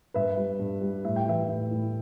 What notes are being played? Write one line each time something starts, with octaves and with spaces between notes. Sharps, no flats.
G2 B4 E5
G3
G2
G3
A2 E5
G5
E3 B4 E5
A2
A2